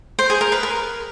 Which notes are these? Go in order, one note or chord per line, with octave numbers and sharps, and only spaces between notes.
C5
G#4
A#4
B4
A#4